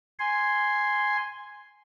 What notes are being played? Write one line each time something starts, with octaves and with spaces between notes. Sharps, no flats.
G#5 C6